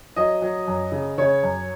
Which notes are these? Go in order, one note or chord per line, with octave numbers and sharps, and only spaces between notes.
F#3 D#5
F#3
F#2
C#3
C#3 C#5
F#2